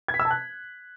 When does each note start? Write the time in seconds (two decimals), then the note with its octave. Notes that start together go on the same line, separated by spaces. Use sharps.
0.08 G#6
0.14 B6
0.20 E6
0.25 A5
0.31 F#6